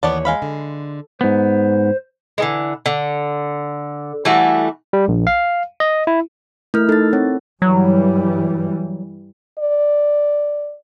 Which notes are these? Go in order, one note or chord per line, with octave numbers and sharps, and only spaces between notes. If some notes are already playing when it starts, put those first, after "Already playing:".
D#2 E3 B3 C#5 D5 A5
G#3 F5 B5
D3
G#2 B3 C5
D3 E3 G#3
D3
E3 G3 A3 F#4
G3
A#1
F5
D#5
E4
A3 E4 A#4 F6
D#4 A4 A6
C4 C#5
G2 E3 F#3 G3
D5